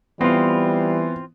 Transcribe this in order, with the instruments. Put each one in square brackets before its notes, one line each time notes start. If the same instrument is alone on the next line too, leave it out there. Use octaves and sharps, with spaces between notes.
[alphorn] E3 [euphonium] G3 [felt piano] B3 [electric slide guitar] C4 F4